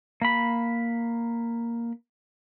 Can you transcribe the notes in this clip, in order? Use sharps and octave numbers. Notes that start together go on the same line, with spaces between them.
A#3 B5